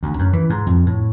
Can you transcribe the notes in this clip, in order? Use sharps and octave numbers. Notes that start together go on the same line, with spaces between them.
D2
F#2
E3
G#2
F2
A2